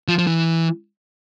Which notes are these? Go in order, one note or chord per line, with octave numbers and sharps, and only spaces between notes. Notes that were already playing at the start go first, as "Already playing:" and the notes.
F3
F3
E3